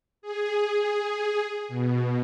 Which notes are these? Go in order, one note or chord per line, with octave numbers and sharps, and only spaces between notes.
G#4
B2